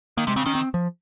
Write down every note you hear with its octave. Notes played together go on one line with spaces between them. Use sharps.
D#3 A#3
C3 G#3
C#3 C4
D#3 C#4
C4
F3